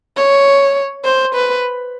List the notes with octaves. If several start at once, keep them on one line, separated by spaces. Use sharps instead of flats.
C#5
C5
B4